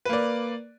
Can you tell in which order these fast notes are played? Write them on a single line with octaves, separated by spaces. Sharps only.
B4 A#3 D5